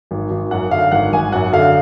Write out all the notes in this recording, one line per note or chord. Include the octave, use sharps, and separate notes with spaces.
G#1
G#1
F#2 F#5
D3 F5
G#1 F#5
G#1 G#5
F#2 F#5
D3 F5